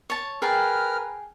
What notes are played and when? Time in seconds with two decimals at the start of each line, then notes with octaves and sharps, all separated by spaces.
0.10 C#5 A5
0.42 G#4 A#4 B4 G5 A5 F6